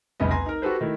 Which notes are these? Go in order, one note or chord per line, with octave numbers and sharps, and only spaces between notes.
F1 C2 C#3 B3 D#5
B4 G#5 A#5 C6 A#6
D#4 A#4
F#4 G4 A4 B4 C5
D#3 A3 E4